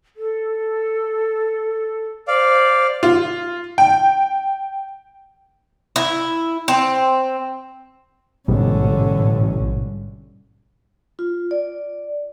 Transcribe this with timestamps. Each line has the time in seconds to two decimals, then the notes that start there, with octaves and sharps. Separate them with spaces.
0.16 A4
2.28 C5 D5 F5
3.03 F4
3.78 G5
5.96 E4
6.68 C4
8.48 A1 G#2 B2 D3 G3 C#4
11.19 F4
11.51 D5